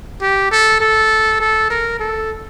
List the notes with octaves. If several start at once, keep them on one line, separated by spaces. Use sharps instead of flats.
G4
A4
A4
A4
A#4
A4